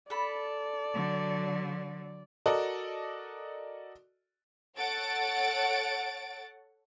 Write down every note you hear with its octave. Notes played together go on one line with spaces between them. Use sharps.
A4 D5 B5
D3 F#3
F#4 A4 A#4 D5 D#5
A4 C#5 F#5 A6 D7